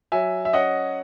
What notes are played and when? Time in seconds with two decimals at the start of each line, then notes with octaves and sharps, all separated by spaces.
0.12 F#3 E5 G#5
0.45 E5
0.53 C#4 D#5 F#5